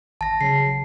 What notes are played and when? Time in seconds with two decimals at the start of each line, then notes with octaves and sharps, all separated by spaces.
0.21 G#1 A5 A#6
0.41 C#3 F#3 C7